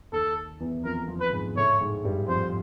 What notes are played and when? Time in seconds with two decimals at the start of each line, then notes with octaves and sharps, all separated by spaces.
0.12 D#2 D#3 A4
0.60 E2 E3
0.84 F2 F3 A#4
1.08 F2 F3
1.20 B4
1.33 G#2 G#3
1.56 A2 A3 C#5
1.80 G#2 G#3
2.04 G2 G3
2.28 F2 F3 C5